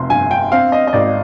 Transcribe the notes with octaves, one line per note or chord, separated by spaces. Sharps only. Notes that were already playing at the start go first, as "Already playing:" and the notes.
Already playing: F1 C3 C6
G1 G#5
G5
C4 F5
D#5
D#5
G#1 D5